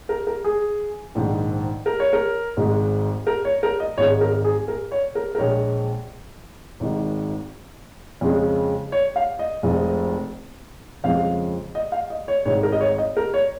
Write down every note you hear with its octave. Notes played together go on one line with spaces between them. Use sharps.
A#4
A#4
G#4
A#1 G#2 D#3
A#4
C#5
A#4
G#1 G#2 G#3
A#4
C#5
A#4
D#5
G#1 G#2 G#3 C#5
A#4
G#4
A#4
C#5
A#4
A#4
A#1 A#2 G#3 C#5
G#1 G#2 D#3 G#3
F2 C#3 G#3
C#5
F5
D#5
F1 F2 F3 G#3
F2 C#3 F3 G#3 F5
D#5
F5
D#5
C#5
G#1 G#2 D#3 G#3 C#5
A#4
D#5
C#5
D#5
A#4
C#5